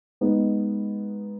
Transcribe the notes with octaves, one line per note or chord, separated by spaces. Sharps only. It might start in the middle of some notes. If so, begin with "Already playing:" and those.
G#3 B3 D#4